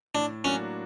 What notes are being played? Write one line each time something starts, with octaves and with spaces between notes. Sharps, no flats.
A2 D4
F#3 A#3 C#4 D4 F#4